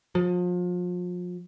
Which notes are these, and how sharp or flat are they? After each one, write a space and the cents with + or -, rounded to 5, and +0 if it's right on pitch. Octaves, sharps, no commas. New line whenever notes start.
F3 +35